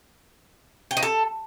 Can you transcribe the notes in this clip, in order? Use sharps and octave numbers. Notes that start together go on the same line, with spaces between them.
G5
D#4
A4